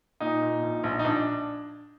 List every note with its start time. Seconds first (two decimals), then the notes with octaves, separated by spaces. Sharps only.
0.20 A#2 D#4
0.41 A#2
0.63 A#1
0.84 A#1
0.99 D#4
1.05 A#1 D4